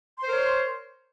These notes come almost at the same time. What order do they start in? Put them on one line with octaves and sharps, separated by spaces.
C6 C5 A#4 C#5